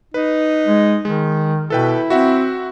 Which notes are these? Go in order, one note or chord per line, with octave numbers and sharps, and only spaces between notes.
D#4 B4
G#3
D#3 G#3
B2 E4 A4 B4 G5
C4 F#4 E5 F#5